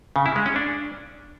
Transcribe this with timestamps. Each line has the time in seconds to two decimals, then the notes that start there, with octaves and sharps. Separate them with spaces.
0.16 C#3
0.26 E4
0.36 G#3
0.46 C#4
0.56 D4